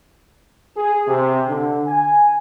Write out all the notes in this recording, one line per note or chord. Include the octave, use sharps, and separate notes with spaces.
G#4
C3
D3
G#5